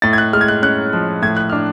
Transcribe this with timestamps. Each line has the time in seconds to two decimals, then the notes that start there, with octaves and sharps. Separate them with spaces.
0.02 A2 A6
0.13 G#6
0.18 F#6
0.33 G#3 F6
0.41 G#6
0.48 F#6
0.62 C#4 F#6
0.93 F3
1.22 A2 G#6
1.37 F#6
1.50 D4 F6